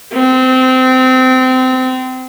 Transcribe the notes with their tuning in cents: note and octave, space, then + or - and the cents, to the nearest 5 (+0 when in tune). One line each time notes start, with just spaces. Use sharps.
C4 -25